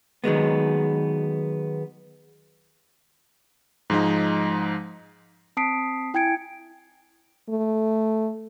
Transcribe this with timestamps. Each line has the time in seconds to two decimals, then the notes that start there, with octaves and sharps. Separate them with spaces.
0.24 D#3 F#3 G#3 B3
3.90 G#2 F3 G#3 D#4
5.57 C4 A5 D#6 B6 C7 D7
6.14 E4 G5 G#5 G#6 C#7 D7
7.49 A3